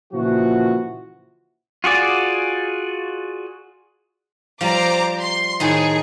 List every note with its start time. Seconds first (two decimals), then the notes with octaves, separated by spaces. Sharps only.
0.13 A#2 C#3 E3 F3 E4 F#4
1.84 F4 F#4 G#4 D5
4.61 F3 G3 C5 A#5 D6
5.19 C6
5.60 A2 D#3 D#4 G#4